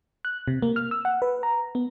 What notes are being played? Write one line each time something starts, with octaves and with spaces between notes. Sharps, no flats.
F#6
C3
A#3
F6
E6
F#5
B4
A#5
B3